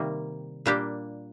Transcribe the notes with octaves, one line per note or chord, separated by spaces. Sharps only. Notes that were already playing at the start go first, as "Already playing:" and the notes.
Already playing: C3 D#3 G3 A#3
A#2 G3 A#3 D4 G4